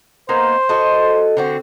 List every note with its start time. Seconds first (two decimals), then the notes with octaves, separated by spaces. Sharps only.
0.29 A#3 B3 D#4 C5
0.69 F#4 A4 D#5
1.37 D3 C4 F#4